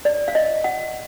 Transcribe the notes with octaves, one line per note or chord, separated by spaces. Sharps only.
D5
F5
D#5
F#5